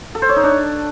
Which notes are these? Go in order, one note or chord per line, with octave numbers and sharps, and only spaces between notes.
A4
C5
C#5
D#4
D4